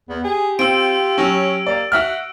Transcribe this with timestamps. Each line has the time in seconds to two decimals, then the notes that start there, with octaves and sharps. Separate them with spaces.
0.09 E2 B3
0.24 G4 G#4
0.59 C4 F4 E6 D7
1.18 F#3 C#4 C#5
1.67 A#3 D5
1.92 F#4 E5 F#5 F6